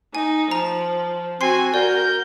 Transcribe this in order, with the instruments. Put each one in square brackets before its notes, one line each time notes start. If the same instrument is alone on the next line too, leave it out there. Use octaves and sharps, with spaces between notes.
[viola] D#4 [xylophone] G#5
[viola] F3 [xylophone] A#5
[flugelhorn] C4 [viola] F#4 [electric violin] G#5 [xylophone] C6 C7
[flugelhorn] F#4 [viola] A#4 [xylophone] D5 [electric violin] G6